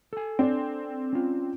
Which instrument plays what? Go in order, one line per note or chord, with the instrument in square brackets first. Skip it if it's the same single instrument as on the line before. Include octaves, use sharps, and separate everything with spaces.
[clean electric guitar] A4 G#5
[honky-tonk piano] C4 D4
[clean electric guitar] C#4 F4